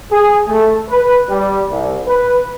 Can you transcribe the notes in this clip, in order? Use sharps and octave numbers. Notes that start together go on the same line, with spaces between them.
G#4
A3
B4
G3
C2
B4